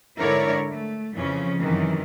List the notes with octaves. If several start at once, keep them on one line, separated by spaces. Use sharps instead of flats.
G#2 D3 E4 A#4 C#5 D5
A3
F2 C#3 E3 F3 C#4
F#2 C3 D#3 E3